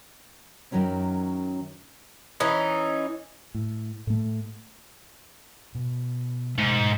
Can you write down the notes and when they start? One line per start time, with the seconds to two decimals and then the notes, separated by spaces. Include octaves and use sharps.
0.71 F#2 D#3 F#3 C#4 E4
2.40 E3 C#4 D#4
3.55 A2
4.07 A2 A3
5.75 B2
6.59 G#2 B2 A3